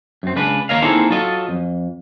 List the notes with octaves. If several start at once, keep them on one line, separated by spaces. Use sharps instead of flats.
F#2 C4
C#2 C#3 D4 B4
D#2 A#3 C#5 D#5 F5
A#3 C4 D#4 E4 G#4 A4
F#3 F4 A4 D#5
F2